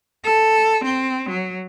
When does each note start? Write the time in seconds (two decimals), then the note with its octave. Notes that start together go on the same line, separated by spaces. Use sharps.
0.24 A4
0.84 C4
1.29 F#3